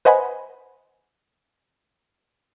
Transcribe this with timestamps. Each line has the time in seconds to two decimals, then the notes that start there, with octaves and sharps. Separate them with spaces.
0.05 B4 C5 D#5 F#5 G#5 B5